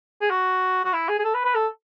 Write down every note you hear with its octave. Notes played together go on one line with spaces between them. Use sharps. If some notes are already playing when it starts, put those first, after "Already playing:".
G#4
F#4
F#4
E4
G#4
G#4
A4
B4
B4
A4